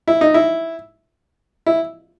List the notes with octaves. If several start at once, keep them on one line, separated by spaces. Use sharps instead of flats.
E4
D#4
E4
E4